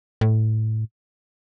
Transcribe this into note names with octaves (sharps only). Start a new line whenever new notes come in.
A2